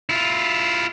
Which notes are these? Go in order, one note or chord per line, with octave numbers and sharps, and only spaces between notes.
E4 F4